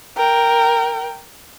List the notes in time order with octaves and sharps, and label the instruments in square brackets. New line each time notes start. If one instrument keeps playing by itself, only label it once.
[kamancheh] A#4 G5